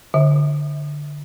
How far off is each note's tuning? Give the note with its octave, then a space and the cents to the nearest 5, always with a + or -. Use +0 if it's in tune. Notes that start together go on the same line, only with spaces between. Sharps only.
D3 +0 E5 -35